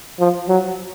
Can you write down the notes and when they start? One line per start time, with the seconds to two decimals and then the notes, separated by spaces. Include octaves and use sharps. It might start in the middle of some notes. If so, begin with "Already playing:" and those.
0.20 F3
0.49 F#3